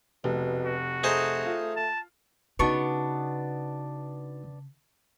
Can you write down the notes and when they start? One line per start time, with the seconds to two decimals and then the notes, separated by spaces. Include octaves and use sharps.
0.24 F1 B2
0.64 F#4
1.04 A3 D#4 G#4 C5
1.45 F4
1.76 A5
2.59 C#3 B3 D4 D#4 F#4 B4 C#6